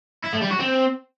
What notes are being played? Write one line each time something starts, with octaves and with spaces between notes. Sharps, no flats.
E4
A3
G3
F#4
C4